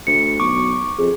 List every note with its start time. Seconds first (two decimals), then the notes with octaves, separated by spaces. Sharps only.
0.07 D2 C#7
0.40 B1 C#6 D6
0.98 F2 G#4